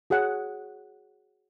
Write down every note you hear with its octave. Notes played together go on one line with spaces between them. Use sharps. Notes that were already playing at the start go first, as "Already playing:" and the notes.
F#4 G#4 C#5 F#5